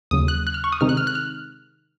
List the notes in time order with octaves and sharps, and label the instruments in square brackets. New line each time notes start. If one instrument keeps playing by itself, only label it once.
[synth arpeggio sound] D#2 C#3 F#3 D#6
F#6
F#6
F6
C#6
D#6
C3 D#3 G#3 C4 D#4 F6
F#6
F6
F#6
F6